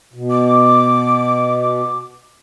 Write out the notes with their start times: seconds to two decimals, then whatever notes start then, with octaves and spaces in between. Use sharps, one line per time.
0.14 B2
0.30 D6